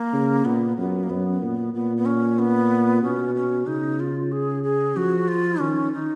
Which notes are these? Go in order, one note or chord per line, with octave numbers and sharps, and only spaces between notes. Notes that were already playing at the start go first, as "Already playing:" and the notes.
Already playing: A#3
C#3
A#2 B3
F#2 B3
A#3
F#2 B3
A#2
A#2 B3
B3
C#4
B3
B2 C#4
C#4
C#3 D#4
F4
G#4
G#4
F3 F#4
F4
D#3 C#4
D#4